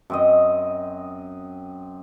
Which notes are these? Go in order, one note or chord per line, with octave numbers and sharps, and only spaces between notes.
F#2 C4 D#5